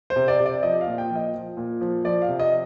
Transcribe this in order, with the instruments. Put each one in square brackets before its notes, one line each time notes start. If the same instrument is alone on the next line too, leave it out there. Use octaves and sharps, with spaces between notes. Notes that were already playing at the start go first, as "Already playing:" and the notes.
[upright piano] C5
C3
D5
C3
D5
F3 D#5
F5
A#2
G5
F3
D#5
F3
A#2
F3
F3 D5
F5
C3
D#5